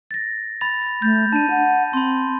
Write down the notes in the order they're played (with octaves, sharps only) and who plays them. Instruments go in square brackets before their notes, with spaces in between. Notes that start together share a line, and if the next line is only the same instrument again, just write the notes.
[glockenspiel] A6 A#6
B5 A6 F7
[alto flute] A3 [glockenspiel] G6 A6
[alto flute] D4 [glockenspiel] A5 D#7
[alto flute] F#5
[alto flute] C4 [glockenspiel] B5 C6